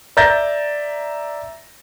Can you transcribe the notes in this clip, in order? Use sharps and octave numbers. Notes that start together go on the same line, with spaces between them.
D5 E5 A#5 G6 A6 A#6